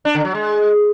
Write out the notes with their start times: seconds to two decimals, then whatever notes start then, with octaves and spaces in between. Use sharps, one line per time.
0.05 D4
0.15 D3
0.25 F#3
0.34 G#3